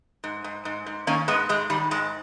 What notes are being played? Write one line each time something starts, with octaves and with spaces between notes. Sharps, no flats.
G#2
G#2
G#2
G#2
D#3 A#3 C#4
G#2 G#3 B3
G#2 G#3
D#3 G3
G#2 G#3